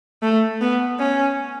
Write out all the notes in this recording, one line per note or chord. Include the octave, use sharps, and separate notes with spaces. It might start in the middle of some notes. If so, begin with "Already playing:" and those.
A3
B3
C#4